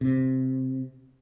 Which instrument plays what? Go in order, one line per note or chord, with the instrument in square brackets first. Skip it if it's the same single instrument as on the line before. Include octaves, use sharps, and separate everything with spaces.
[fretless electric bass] C3